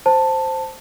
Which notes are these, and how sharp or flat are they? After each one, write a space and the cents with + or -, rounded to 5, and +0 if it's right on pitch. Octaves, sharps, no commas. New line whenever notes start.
C5 +0 A5 +10